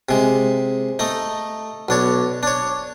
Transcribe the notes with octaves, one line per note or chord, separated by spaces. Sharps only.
C3 G#3
A3 D#4
B1 D4 C#5
D4 C#5